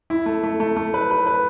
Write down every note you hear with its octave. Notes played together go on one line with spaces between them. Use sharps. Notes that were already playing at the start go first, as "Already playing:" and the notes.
E4
A3
A3
A3
A3
B4
B4
B4